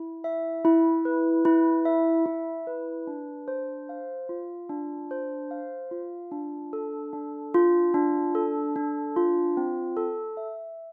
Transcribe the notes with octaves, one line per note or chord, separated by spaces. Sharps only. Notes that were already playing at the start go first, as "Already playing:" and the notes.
Already playing: E4
E5
E4
B4
E4
E5
E4
B4
D4
C5
F5
F4
D4
C5
F5
F4
D4
A4
D4
F4
D4
A4
D4
F4
C4
A4
E5